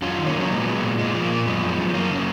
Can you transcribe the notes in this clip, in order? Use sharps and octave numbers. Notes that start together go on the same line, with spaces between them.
F#2 C#4 F4
D#3
A#3 C#4
F#3
C#4
A#2 G#3 B3
F#3
A#2
A#2 G#3
F3
A#3
A#2
F#2 G#3 B3
F3
F#2
F#2 A#3 C#4
C#3